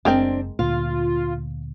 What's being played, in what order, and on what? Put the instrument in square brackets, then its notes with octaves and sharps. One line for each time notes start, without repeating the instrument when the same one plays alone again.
[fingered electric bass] F#1 [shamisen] G#3 A#4 G5 [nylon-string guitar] C4 D4
[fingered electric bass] D2 A#2 [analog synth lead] F4 [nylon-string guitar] F5